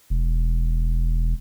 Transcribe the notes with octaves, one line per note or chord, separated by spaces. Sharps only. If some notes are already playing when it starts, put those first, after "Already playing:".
E1